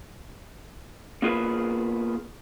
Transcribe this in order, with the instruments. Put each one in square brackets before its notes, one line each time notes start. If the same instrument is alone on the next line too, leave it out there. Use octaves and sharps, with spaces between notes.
[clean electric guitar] A#3 B3 F4 G#4 A#4 B4